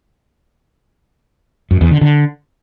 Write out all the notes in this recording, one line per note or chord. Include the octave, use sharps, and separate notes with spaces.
F#2
E2
D3
D3